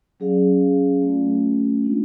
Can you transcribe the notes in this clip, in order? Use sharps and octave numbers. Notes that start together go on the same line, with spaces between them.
F#3 C#4 G#4 D5 F5
A3 C#4 F4
G#3 B3 D4 F4